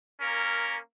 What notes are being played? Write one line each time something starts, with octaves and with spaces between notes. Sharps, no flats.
A#3 C#4 A#4